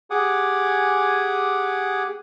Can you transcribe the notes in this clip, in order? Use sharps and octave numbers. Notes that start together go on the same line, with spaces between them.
G4 G#4 F#5 G#5 D6 D#6